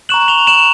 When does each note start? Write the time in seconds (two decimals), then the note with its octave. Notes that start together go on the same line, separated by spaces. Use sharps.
0.09 A#5 C#6 F#6 E7 F#7
0.23 F#7
0.28 F7 G7
0.47 E7 F#7